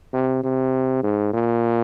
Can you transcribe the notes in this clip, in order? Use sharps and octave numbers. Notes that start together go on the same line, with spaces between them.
C3
C3
G#2
A#2